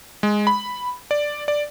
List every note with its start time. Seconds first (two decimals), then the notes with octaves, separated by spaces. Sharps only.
0.23 G#3
0.47 B5
1.11 D5
1.48 D5